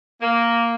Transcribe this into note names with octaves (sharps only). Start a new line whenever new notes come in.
A#3